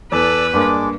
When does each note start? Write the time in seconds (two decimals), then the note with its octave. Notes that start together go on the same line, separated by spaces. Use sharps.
0.12 E2 A4 B4 D5 D6 E6
0.53 G2 G#3 A#3 D4 D6